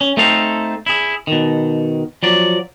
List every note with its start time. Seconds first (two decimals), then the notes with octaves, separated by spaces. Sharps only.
0.01 C#4
0.17 A3 C4 D#4 A4 F5
0.86 E4 G#4
1.27 B2 D#3
2.23 F3 F#3 D5